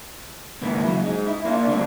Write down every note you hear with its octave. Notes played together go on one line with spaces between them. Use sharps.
C#2 G#2 D#3 A#3 E4 B4
C#3 F#3
G#3 D#4
E4
A#3 D4 F4
D3 G3 A3 C4 D4